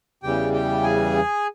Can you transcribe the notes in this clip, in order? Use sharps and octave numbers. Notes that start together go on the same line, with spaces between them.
E2 C#3 E3 G3 G4 G5
G4 G5
G#4 G#5